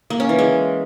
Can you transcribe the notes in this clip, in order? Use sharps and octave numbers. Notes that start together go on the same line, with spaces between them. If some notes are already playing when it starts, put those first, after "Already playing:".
A#3
C#4
E3
G#3